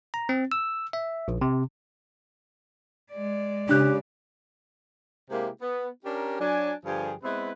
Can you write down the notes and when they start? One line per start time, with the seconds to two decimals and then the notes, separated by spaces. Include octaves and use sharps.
0.14 A#5
0.29 C4
0.52 E6
0.93 E5
1.28 A#1
1.41 C3
3.13 G#3 D5
3.69 C#3 D4 G4 F#6 G6
5.30 C3 G#3 A#3 E4 G4
5.61 B3
6.05 C#4 D4 G4 A#4
6.40 F#3 D4 G#5
6.85 G2 D3 F3 G4 G#4
7.24 G#3 B3 C4 E4 B4